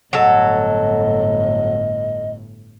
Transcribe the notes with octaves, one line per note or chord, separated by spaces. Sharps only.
G1 A2 F#3 A4 D#5